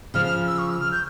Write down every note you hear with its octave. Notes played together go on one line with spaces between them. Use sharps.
C#3 F3 F6
F6
E6
C#6
E6
F6
G6